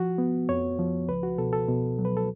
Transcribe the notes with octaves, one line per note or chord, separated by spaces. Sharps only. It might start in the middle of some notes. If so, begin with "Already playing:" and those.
Already playing: F3 F#4
B3
F2 C#5
F3
C#2 B4
F#4
B2 A4
A4
B2
F#3
B4
A4